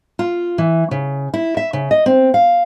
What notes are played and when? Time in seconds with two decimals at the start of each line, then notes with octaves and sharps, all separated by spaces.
0.19 F4
0.58 E3
0.91 C#3
1.34 E4
1.57 E5
1.73 C#3
1.91 D#5
2.06 C4
2.34 F5